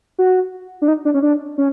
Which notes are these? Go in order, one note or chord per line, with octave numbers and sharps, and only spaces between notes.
F#4
D4
D#4
D4
C#4
D4
C#4